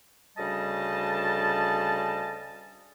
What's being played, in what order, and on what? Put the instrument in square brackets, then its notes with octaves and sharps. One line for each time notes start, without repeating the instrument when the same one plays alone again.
[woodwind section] D2 C#3 G3 D#5 A5